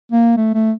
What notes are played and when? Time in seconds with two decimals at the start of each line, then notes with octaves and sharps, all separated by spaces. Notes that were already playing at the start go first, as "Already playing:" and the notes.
0.12 A#3
0.37 A3
0.54 A3